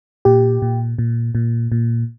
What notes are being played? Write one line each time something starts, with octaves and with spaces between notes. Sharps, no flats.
A#2 G4
A#2
A#2
A#2
A#2